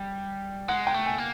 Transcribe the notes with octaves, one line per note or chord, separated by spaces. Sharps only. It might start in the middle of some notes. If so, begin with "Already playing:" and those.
Already playing: G3
G#3 F#5
G5
A3
G#5
A#3